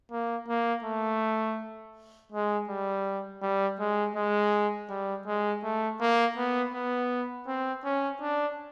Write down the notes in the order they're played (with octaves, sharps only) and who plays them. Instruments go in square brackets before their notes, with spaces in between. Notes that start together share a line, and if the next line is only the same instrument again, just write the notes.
[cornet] A#3
A#3
A3
G#3
G3
G3
G#3
G#3
G3
G#3
A3
A#3
B3
B3
C4
C#4
D4